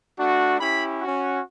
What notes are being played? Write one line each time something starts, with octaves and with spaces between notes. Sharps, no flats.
A3 D4 F#4
C#4 E4 G4 B5
C#4 F#4